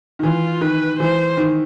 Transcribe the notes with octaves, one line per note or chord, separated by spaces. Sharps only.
D#3
E3 F4
D#3 B4
E3 C5
D#3